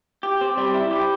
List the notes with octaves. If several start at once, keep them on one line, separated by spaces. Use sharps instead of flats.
G4
C4
G3
E4
G4